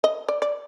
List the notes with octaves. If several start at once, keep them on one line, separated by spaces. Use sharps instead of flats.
D#5
D5
D5